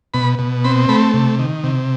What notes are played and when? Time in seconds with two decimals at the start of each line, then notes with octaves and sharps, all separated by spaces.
0.14 B2 B5
0.39 B2
0.64 C4 B5
0.89 A3 B5
1.14 C3
1.39 D#3
1.64 C3